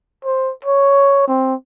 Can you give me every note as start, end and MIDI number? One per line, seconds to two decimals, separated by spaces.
0.24 0.52 72
0.65 1.25 73
1.28 1.55 60